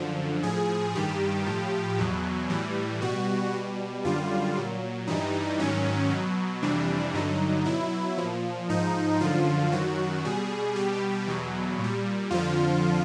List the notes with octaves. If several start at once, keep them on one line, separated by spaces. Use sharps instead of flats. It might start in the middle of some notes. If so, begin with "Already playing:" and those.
Already playing: F#2 D3 F3
A2 F3 G#4
G2 D#3 G3 G4
A2 F3
E2 B2 F#3
A2 E3 G3
B2 G3 F#4
B2 G3
F#2 D3 G3 F4
A#2 F#3
G2 E3 G3 D#4
G#2 D#3 F#3 C#4
B2 F#3
F2 C3 E3 G3 D4
G2 D3 F#3 D#4
B2 F#3 E4
A#2 F3
G#2 F3 D#4
F#2 D3 F3 F4
F#2 D#3 F#3 F#4
B2 G3 G#4
B2 G3 G4
E2 B2 F#3
A#2 G3
F2 D3 F3 F4